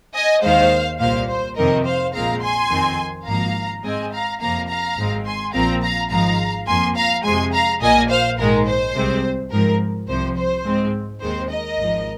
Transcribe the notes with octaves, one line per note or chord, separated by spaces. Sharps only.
D#5 G#5
D#2 D#3 G#3 C5 F5
C2 A#2 A#3 C5 F5
C5
F2 C3 D#3 C4 A#4 D#5
C5 F5
A#1 A#2 G#3 C4 F5 A#5
G#5 C6
F2 D#3 C4
G#1 G#2 F3 A#3 F5 A#5
G#2 G#3 C4 D#5 G#5
F5 A#5
F2 C3 F3 A#3 F5 A#5
F5 A#5
G#1 G#2 G#3 C4
G#5 C6
A#1 A#2 F3 C4 F5 A#5
F5 A#5
G#1 G#2 F3 G#3 F5 A#5
F2 F3 A#3 G#5 C6
F5 A#5
F2 C3 G#3 G#5 C6
F5 A#5
A#1 A#2 A#3 D#5 G#5
C5 F5
A#1 G#2 D#3 G#3 A#4
C5
C2 C3 G#3 C4
G#2 F3 C4 A#4
C2 C3 F3 C5
C5
G#2 G#3 C4
D#2 D#3 G#3 C4 C5
A#4 D#5
G#1 G#2 F3